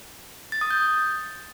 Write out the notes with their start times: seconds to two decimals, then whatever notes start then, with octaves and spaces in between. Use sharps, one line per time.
0.52 A6
0.61 D#6
0.70 G6